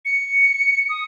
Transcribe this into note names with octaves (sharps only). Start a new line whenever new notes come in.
C#7
D#6